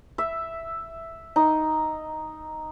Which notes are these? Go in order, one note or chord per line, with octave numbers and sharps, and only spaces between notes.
E5
D#4